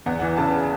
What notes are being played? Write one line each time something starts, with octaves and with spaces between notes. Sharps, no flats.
E2 F#5
E3
C#3 A5